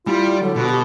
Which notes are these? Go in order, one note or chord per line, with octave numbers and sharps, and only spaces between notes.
G3 E4 F4
D3 F#3
B2 F#4
G4